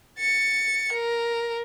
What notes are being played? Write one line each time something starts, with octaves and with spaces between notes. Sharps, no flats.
A6 C#7
A#4